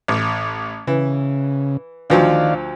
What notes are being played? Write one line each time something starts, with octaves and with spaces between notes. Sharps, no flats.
A1
C#3 E3
D2 D#3 F3 F#3 D5 F5